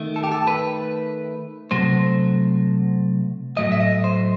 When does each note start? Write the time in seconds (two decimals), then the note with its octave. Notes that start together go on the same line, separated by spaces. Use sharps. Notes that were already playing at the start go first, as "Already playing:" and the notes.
Already playing: D#3 A3
0.16 A4
0.24 G4
0.32 A4
0.47 B4
1.71 C3 F#3 A3 C5
3.57 A2 F#3 A3 D#5
3.72 E5
3.81 D#5
4.04 C5